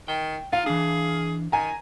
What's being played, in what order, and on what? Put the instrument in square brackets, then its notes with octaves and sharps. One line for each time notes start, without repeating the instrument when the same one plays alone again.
[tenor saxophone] D#3 [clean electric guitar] G5
[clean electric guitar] D#4 [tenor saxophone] F4 [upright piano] F5
[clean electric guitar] E3 D4 [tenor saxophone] G#4
[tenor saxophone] D#3 [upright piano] G#5 A#5